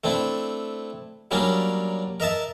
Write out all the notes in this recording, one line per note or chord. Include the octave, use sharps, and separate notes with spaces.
A3 C4 D4 E4
F#3 G3 A#3 C#4 D4 A#4
A#4 D#5 E5 A5